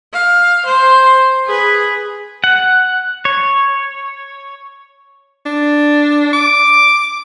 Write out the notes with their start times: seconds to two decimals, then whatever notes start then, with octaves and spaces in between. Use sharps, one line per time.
0.13 F5
0.66 C5
1.46 G#4 B4
2.44 F#5
3.25 C#5
5.46 D4
6.33 D6